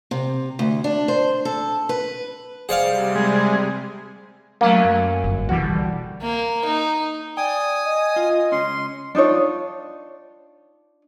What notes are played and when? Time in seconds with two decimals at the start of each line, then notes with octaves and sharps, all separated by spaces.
0.11 C3
0.59 D2
0.84 D4
1.08 C5
1.45 A4
1.89 B4
2.69 C3 G3 G#4 C5 D5 F5 F#5
3.15 G#3
4.61 F#3 A3 A#3 C#4
4.84 F#2
5.24 G1
5.49 C2 B2 D3 E3 G3 F#4
6.22 A#3
6.65 D#4
7.37 D5 G5 G#5 D#6
7.85 D#5
8.16 F4
8.52 C#2 C#4 C6
9.15 D4 D#4 F4 C#5